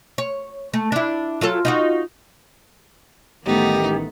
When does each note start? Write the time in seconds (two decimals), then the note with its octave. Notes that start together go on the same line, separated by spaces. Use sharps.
0.18 C#5
0.73 A3
0.92 D4 E4
1.41 F#3 F4 A4
1.65 D#4 F4 F#4
3.46 A1 D#3 G3 A3 B3 D#4 G4